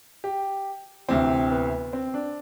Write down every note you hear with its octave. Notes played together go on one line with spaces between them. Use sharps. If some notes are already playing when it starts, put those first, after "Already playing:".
G4
D2 C3 E3 C4
B3
C4
D4